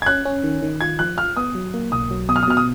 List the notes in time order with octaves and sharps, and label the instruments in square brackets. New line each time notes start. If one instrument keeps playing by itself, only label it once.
[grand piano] G#6
[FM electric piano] C#4 [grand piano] F#6
[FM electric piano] C#4
D#3
D#3
[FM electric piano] F4 [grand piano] G#6
[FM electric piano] F3 [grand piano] F#6
[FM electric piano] F4 [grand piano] F6
[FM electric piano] B3 [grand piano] D#6
[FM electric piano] F#3
A#3
[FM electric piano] B1 [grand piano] D#6
[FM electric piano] F#3
[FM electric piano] B2 [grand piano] D#6
[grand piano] F6
D#6
[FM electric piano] B2 [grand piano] F6
[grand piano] D#6